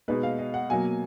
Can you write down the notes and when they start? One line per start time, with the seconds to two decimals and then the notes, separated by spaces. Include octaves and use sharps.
0.08 B2 G#3 D#4 B4
0.23 F5
0.38 D#5
0.54 F#5
0.70 B2 F#3 A#3 G#5